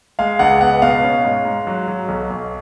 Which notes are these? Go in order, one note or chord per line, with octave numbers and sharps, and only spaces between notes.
G#3 F5
C#2 F#5
B3 F#5
B2 F5
C#4
G#2
G#2
F#3
F#3
B1
B1